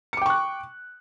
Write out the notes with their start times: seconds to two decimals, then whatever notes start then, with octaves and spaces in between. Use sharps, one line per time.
0.13 C#7
0.17 D6
0.21 G5
0.26 C#6
0.30 F#6